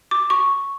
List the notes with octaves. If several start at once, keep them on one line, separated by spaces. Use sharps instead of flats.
D6
C#6